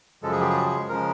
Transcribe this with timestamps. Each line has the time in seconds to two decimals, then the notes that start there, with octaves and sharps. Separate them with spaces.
0.23 F#2 C#3 F3 G#3 A4
0.32 G#4
0.40 G4
0.49 G#4
0.89 C#3 F3 G#3 A#4